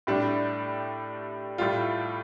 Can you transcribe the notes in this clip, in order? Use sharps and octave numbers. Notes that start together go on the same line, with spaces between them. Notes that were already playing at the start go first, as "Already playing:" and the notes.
A2 G3 D4
A2 G3 F4